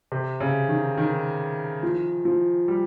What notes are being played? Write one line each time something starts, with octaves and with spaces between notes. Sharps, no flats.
C3
C#3
D#3
D#3
F3
F3
G3